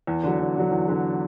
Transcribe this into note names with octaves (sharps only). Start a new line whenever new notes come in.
E2
D3 F#3
E2
D3 F#3
E2
D3 F#3